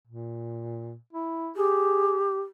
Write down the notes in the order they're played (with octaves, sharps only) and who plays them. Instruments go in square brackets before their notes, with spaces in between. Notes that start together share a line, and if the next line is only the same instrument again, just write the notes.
[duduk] A#2
E4
[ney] G4 [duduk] G#4